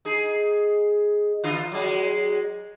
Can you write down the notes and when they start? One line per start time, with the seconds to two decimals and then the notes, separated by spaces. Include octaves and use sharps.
0.05 D#4 G#4
1.44 D3 E4 F4
1.72 F#3 G#3